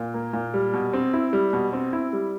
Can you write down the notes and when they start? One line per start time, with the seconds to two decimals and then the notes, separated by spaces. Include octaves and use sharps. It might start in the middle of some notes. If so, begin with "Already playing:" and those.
Already playing: A#2
0.14 A#3
0.33 A#2
0.54 G3
0.73 B2
0.93 C4
1.13 E4
1.33 G3
1.53 B2
1.73 C4
1.93 E4
2.13 G3